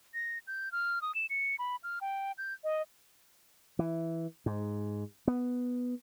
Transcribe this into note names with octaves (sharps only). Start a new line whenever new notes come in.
A#6
G6
F6
D#6
E7
C#7
B5
F6
G5
G6
D#5
E3
G#2
B3